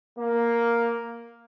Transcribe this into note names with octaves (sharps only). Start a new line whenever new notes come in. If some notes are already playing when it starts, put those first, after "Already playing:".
A#3